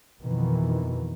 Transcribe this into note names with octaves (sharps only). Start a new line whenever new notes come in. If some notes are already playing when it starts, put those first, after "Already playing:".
F2 B2 D#3 E3